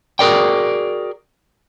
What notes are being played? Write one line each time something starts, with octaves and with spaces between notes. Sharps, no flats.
F#4 G#4 A#4 D5 G5